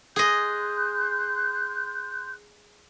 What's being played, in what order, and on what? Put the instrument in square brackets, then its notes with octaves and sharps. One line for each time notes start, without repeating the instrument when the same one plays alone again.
[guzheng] G#4 D#5 [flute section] C6 F#6 G6